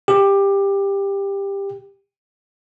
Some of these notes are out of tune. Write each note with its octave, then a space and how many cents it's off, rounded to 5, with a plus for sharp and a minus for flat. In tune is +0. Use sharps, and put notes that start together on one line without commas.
G4 +15